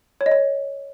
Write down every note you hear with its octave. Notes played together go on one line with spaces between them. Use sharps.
C#5
D#5
C#5